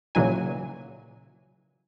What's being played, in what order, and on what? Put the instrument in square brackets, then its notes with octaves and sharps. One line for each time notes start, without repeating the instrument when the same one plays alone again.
[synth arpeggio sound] A#2 C#3 E3 F#3 D#4 G#5